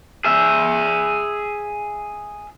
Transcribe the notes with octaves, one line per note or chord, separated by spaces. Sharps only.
G#4 E5